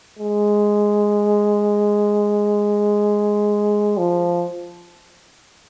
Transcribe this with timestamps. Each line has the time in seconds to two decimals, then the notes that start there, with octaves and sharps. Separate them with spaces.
0.19 G#3
3.98 F3